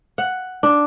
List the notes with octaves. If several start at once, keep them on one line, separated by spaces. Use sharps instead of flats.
F#5
D4